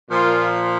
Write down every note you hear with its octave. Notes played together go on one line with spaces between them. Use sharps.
A#2 F3 F4